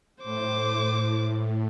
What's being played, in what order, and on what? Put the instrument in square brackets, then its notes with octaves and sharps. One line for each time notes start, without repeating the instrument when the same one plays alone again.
[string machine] A2 [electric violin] C5 D6